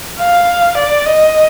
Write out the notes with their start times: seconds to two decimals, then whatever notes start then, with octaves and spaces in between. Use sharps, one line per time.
0.20 F5
0.77 D5
1.06 D#5